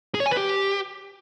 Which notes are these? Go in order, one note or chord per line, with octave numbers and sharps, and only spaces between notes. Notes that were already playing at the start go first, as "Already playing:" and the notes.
G#4
C#5
G#5
B4
G4